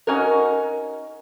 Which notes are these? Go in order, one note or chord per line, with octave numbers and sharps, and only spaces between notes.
C#4 D#4 F#4 A#4